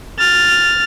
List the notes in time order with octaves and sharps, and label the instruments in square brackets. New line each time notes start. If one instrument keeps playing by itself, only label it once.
[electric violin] F6 A6